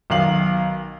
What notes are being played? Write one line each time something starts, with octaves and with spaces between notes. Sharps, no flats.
B1 D#3 F5 F#7